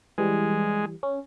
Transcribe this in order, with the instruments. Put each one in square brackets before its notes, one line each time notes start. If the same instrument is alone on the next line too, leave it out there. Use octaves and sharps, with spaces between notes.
[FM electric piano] E3 G3 [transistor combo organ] G#3
[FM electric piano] C#4